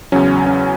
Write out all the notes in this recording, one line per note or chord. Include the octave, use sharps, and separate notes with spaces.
E2 C#3 F#3 C#4
C#4